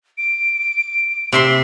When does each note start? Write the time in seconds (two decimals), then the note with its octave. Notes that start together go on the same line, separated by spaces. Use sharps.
0.18 D7
1.32 C3 E5 C6